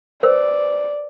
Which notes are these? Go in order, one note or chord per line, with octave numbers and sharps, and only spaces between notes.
B4 C5 D5 E6